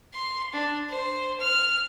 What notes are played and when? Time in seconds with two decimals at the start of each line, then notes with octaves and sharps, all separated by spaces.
0.13 C6
0.53 D4
0.89 C5
1.40 F6